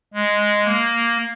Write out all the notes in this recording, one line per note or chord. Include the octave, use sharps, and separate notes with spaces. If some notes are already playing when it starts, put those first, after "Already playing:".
G#3
A#3